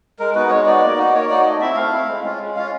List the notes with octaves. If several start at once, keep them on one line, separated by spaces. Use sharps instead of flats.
G#3 A#4
B3 D#4 F#4 B4
G#3 C#5
B3 D#4 F#4 D5
A#3
D#4 F#4
A#3 C#5
D#4 F#4 D5
A3 D#5
C4 E4 E5
A3 F5
C4 E4
G#3
C#4 F4
G#3
C#4 F4 F5